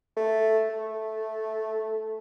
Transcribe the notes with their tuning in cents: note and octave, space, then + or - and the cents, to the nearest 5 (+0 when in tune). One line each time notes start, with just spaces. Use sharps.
A3 +0
A3 -5